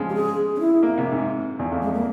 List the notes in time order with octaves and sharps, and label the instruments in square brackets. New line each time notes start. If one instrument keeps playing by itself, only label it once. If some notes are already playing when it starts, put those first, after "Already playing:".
Already playing: [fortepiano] C#3 F3 G#3
[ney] G4
G#4
C#4
E4
[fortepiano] A#3
C3
G#2
E2
F2
[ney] G#3
A#3